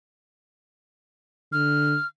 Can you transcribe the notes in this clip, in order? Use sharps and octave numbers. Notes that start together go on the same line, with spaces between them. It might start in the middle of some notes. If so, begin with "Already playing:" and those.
D3 F6